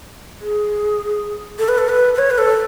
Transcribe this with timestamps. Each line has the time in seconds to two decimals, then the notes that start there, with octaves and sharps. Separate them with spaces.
0.41 G#4
1.59 A4
1.68 B4
1.78 A4
1.89 B4
2.14 B4
2.18 C#5
2.30 B4
2.38 A4